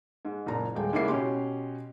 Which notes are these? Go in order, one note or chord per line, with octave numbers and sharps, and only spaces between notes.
G#2
F#1 A#2 A#5
D#1 G#3 G5
G#2 C#3 A#3 E4 D6 C7
B2 C#4 G4 C6